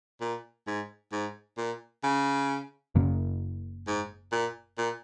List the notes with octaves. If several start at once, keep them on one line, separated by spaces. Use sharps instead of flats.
A#2
G#2
G#2
A#2
C#3
F#1 F#2 C#3 A#3
G#2
A#2
A#2